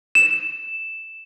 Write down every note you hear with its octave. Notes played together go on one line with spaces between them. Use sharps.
E7